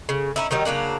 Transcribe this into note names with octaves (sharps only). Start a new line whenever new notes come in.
C#3
C#4 D#4 E4
D#3 F#3 G3 D#4
C#3 F#3 A#3 D4